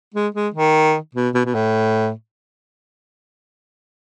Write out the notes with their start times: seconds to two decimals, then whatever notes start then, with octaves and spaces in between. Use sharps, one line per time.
0.14 G#3
0.35 G#3
0.54 D#3
1.15 B2
1.34 B2
1.45 B2
1.55 A2